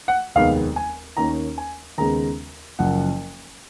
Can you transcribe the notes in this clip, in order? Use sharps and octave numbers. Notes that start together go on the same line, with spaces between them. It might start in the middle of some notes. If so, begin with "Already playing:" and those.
F#5
F1 D#2 D#3 G#3 B3 F5
G#5
D#2 D#3 A#3 C#4 A#5
G#5
D#2 C#3 G#3 B3 A#5
F#1 F#2 F3 F#5